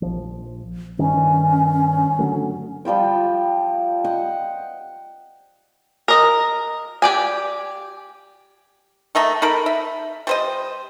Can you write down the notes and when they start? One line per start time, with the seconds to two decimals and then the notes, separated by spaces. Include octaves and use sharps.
0.02 A#1 F3
0.99 G2 D#3 C#4
2.19 D3 F#3 A3
2.85 F3 G3 F4 G5
4.04 D#5 F#5 G5
6.08 A#4 D#5
7.02 G4 D5 G#5
9.15 D#3 A3 D#5 A#5
9.42 D#4 A4 A#4 B5
9.66 E5
10.27 G3 C5 D#5